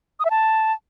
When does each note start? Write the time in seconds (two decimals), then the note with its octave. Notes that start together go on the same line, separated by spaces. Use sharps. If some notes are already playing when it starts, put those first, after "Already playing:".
0.20 D#6
0.25 E5
0.30 A5